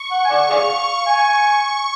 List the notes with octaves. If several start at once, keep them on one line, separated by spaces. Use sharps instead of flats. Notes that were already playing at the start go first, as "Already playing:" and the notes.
Already playing: C#6
F#5
G#5
D5 F#5
G#4 D5 F5
G#5 C#6